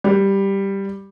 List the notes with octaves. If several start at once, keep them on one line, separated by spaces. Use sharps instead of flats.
G3